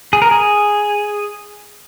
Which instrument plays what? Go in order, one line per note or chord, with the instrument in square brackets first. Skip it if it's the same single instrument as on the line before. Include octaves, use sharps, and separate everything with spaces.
[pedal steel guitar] G#4
A#4
G#4